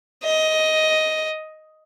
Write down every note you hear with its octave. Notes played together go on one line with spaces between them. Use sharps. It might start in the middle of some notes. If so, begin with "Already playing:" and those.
D#5